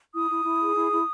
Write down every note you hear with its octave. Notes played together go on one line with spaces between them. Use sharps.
E4 D#6
E4
E4
G#4
E4
E4